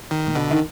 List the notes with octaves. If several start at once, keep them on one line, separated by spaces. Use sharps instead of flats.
D#3
A#2
B2 D3
D#3